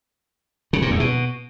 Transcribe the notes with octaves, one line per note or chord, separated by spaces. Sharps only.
C#3
A#2
E2
B2